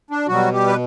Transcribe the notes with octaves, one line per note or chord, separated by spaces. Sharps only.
D4
B2 F#3 G3 F#4
G3 G4
B4